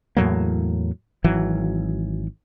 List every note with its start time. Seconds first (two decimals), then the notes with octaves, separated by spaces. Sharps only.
0.17 E2 A2 F#3 A#3
1.24 G#1 E3 F#3